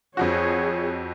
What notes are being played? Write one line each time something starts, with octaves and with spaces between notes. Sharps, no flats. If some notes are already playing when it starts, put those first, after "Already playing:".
F2 F3 F#4 G#4 C#5